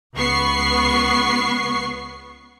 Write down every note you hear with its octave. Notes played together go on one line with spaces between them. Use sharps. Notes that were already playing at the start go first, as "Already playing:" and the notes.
C#2 B3 C#6 C7